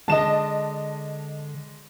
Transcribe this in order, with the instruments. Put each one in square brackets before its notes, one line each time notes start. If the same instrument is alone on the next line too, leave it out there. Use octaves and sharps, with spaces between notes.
[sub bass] D3 [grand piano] G#3 D4 E7 [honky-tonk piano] D#5 A5